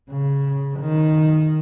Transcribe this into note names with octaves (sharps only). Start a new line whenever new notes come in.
C#3
D#3